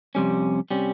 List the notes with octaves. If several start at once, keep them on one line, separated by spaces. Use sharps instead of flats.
F2 C3 G3 C#4
C3 G3 C#4